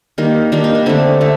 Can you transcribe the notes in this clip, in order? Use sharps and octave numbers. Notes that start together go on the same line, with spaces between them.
D#3 G3 A#3
D#3 G3 A#3 D4
D#4
D4
D3 A3 C4
D3 A3